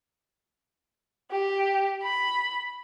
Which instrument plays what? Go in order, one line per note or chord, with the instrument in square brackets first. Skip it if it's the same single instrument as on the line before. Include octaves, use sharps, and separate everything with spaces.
[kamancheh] G4
B5